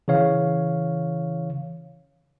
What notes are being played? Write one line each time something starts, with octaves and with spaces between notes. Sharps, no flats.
C#3 E3 C#5 F5